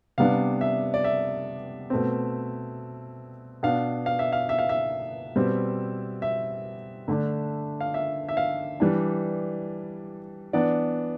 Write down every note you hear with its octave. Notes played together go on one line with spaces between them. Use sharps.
C3 G3 B3 D4 F5
E5
D5
E5
B2 A3 C4
B2 B3 D4 F5
F5
E5
F5
E5
F5
E5
B2 G3 C4
E5
D3 A3 D4
F5
E5
E5
F5
E3 G3 D4
E3 B3 D4 D5